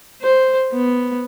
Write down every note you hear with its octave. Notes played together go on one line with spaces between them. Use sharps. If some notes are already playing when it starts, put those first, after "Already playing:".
C5
B3